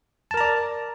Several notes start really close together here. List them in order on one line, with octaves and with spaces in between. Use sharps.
A5 A#4 A#5 D5